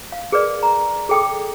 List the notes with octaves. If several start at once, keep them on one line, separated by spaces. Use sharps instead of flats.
F5
G#4 A#4 B4 D5
A#5
G#4 A4 G5 D6 D#6